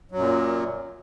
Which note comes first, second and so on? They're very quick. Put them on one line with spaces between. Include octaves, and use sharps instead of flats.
F#3 F#2 A#2